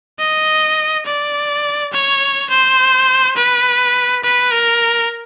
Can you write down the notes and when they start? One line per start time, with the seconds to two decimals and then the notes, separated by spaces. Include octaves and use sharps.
0.19 D#5
1.05 D5
1.93 C#5
2.50 C5
3.37 B4
4.24 B4
4.53 A#4